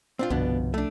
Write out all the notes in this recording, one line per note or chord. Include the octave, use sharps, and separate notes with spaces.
C4 D4 F4
G1 C2 B2 F3 B3 D4
A3 D4